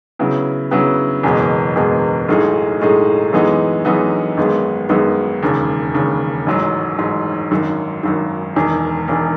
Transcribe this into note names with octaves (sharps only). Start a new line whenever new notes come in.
C#3 F#3 B3 E4
C#3 F#3 B3 E4
F#1 E2 B2 G#3 B3
F#1 E2 B2 G#3 B3
B1 A2 G#3 D#4 G#4
B1 A2 G#3 D#4 G#4
F#2 E3 G#3 B3 D#4
F#2 E3 G#3 B3 D#4
G#1 F#2 D#3 G#3 B3
G#1 F#2 D#3 G#3 B3
E1 D#2 C#3
E1 D#2 C#3
A1 G#2 F#3
A1 G#2 F#3
G#1 F#2 D#3
G#1 F#2 D#3
E1 E2 D#3
E1 E2 D#3